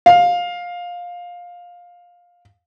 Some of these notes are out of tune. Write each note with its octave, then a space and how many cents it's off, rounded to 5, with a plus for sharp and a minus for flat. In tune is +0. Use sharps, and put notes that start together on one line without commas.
F5 +15